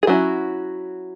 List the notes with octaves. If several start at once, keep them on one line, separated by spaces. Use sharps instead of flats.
G#4
F#3 C#4 E4 F#4